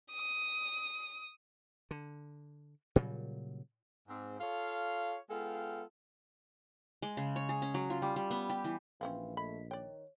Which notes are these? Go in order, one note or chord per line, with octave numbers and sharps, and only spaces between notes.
D#6
D3
A#2 C#3 F#3 G3
G#2 C4
F4 A4 C#5 F5
G#3 B3 F4 A4 F5 G5
G#3
C#3
C#5
G#4
C#4
F#3
F4
G3
G3
B3
G4
E3
A#1 E3 F3 C4 C#4 F5
A3 D#5 B5 B6
D#3 C#5 D5 G5